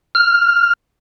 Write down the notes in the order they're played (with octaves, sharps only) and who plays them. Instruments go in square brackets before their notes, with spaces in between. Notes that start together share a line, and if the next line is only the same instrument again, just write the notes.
[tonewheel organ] F6